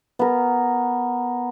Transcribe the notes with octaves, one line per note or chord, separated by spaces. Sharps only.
B3 A#4